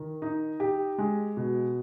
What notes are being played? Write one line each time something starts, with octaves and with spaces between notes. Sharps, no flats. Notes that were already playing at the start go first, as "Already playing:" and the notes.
Already playing: D#3
D#4
G4
G#3
B2